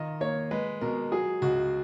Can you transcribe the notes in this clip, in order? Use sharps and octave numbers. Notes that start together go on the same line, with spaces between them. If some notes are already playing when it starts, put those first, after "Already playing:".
Already playing: D#3 F4 D#5
A#3 C#5
G#3 B4
B2 A#4
F#3 G#4
C#2 F#4